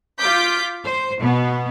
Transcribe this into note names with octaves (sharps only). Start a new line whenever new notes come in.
F4 D6 G6 B6
C5
B2 B3